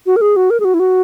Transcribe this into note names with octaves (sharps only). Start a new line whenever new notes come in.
F#4
A#4
G#4
F#4
A#4
G#4
F#4
E4
F#4